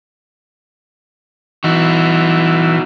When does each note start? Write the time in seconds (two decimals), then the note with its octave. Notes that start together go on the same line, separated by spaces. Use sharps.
1.64 E3 D#4 F#4